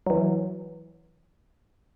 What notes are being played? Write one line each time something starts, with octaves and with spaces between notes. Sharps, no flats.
E3 F#3